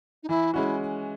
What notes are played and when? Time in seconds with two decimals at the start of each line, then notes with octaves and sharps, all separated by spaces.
0.23 D#4
0.29 E3 E4
0.54 G#3 C#4 E4 F#4